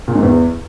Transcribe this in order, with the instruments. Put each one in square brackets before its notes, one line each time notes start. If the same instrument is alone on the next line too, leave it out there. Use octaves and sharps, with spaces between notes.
[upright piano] A#2
G#2
E2